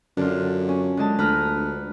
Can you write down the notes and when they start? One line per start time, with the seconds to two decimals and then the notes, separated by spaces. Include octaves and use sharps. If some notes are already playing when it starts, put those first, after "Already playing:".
0.17 F#2 D3 D4 F4
0.69 C#4
0.97 D3 G#3 A5
1.19 D2 B4 A#5 F6